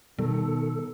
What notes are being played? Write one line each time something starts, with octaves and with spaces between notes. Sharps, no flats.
B2 D#3 G3 A4